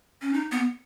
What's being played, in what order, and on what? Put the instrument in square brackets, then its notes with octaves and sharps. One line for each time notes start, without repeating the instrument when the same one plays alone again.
[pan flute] C#4
D#4
B3